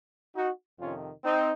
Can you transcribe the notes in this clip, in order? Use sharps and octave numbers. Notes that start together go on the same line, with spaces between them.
D#4 F#4
F2 C3 D#3 C#4 F4
C4 D#4